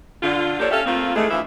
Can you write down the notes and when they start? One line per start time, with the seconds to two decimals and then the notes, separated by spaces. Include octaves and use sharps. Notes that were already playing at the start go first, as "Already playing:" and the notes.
0.23 D3 F4
0.60 F3 A#3 D4 G4 A4 C#5
0.71 C#4 G4 A4 E5 F5
0.87 F3 A3 A#3 C4 F4
1.15 D#3 E3 G#3 A3
1.31 D2 E3 F3 E5